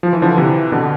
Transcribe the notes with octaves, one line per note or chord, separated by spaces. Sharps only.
F3
E3
D3 F3
C3 E3
B2 D3